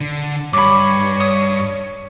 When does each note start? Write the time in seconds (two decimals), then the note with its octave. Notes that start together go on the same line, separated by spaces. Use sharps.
0.01 D3
0.53 G2 C#5 B5 D6
1.20 D#6